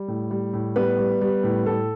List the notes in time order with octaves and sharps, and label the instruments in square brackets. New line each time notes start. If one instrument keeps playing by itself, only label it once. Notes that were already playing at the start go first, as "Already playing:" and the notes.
Already playing: [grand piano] G3
A2
G3
A2
G3 B3 B4
G3
G3
A2
A2 A4